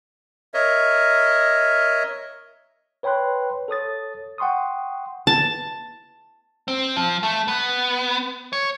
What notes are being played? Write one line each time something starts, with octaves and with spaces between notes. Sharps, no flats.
A#4 C#5 D#5 E5
B4 C#5 G5 B5 C6 F#6
A4 C#5 D#6 A6
F#5 G5 C6 C#6 D#6
A5
C4
F3
A3
B3
C#5